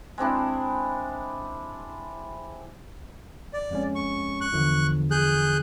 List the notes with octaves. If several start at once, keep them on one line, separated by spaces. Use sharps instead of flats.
G#3 C4 D4 E4
D5
F2 G#3 C#4
C#6
C#6 F#6
E2 D3 F3
G#4 F#6 G6